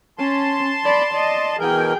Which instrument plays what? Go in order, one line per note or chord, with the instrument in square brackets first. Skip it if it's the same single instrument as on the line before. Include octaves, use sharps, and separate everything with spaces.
[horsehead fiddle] C#4 [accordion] A5 C6
[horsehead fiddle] D5 B5
D5 D#5
[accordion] B2 E3 A#4 [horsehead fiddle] G#4 G5